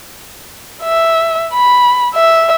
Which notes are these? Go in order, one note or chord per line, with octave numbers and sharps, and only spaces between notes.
E5
B5
E5